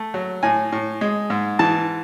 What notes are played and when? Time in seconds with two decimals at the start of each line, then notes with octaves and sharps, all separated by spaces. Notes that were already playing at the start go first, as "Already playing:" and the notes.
Already playing: A3
0.14 F#3
0.43 A2 G#5
0.72 A2
1.01 G#3
1.30 G#2
1.59 E3 A5